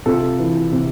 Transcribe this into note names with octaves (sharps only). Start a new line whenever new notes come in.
C3 F4 A4
E3
C3